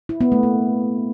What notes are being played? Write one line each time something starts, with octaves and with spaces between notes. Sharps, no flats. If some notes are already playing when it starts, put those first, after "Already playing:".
E4
B3
A3
A#3